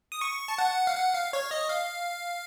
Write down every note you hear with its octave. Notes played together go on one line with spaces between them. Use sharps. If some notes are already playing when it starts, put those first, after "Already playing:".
D#6
C#6
A5
F#5
F5
F#5
F5
C#5
D#5
F5